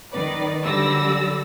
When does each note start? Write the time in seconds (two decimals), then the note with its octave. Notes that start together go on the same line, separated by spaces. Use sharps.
0.13 D#3 B4 D5
0.65 D3 F#3 G3 D5 E6 A#6